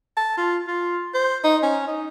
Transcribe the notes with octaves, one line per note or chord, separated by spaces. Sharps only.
A5
F4
F4
C5
D#4
C#4
D#4